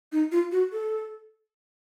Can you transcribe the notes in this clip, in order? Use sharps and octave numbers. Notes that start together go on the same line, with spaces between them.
D#4
F4
F#4
A4